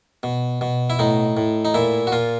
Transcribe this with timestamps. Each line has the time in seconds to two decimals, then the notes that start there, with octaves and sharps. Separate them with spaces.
0.23 B2
0.61 B2
0.90 E4
0.99 A2 D#4
1.37 A2
1.65 D#4
1.74 A#2 E4
2.07 F#4
2.12 A#2 F4